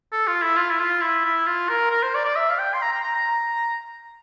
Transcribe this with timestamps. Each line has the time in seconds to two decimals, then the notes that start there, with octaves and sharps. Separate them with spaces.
0.12 A4
0.27 F4
0.42 E4
0.57 F4
0.71 E4
0.80 F4
1.02 E4
1.25 E4
1.47 F4
1.69 A#4
1.91 A#4
2.03 C5
2.15 D5
2.25 D5
2.36 E5
2.50 F5
2.59 G5
2.74 C6
2.82 A#5
2.92 A#5
3.04 A#5
3.15 A#5